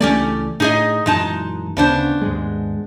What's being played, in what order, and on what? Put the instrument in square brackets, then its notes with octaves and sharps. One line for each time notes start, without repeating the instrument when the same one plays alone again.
[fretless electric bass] C#2 E3 A3 [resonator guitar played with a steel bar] C#4 G4 D5
[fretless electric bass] A2 [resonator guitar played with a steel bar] D#4 G#4 D#5
[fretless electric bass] F#2 A#2 E3 [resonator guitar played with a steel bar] G#3 D#4 A5
[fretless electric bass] D2 C#3 [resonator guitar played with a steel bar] B3 D4 C5
[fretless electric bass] D#2 G#2 G#3